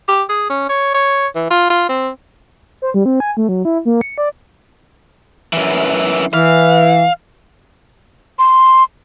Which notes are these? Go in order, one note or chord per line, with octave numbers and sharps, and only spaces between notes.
G4
G#4
C#4
C#5
C#5
E3
F4
F4
C4
C5
G3
C4
G#5
A3
F#3
E4
A#3
C#7
D5
F#2 E3
E3 F5
C6